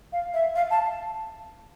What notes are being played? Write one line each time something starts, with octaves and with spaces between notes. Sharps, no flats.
F5
E5
F5
A5